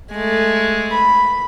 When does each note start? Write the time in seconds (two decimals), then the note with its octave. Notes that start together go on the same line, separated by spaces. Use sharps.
0.12 G#3 A3
0.91 B5